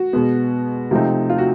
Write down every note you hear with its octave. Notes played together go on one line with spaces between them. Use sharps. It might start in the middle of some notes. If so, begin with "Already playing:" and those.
Already playing: F#4
B2 G#3 B3
C3 F3 A3 C4 D#4
F4
F#4